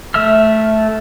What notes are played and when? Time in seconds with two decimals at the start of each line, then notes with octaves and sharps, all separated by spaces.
0.14 A3 E5 E6 F6